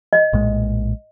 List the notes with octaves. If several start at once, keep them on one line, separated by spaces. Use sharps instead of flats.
D#5
A#1 A2 G#3